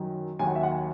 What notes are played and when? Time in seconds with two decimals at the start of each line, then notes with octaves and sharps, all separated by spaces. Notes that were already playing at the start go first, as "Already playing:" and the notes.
Already playing: F#2 D#3 F#3
0.39 D#2 D#3 F#3 G#5
0.47 F#5
0.56 E5
0.63 F#5
0.72 G#5